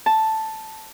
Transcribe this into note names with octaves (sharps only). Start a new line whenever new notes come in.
A5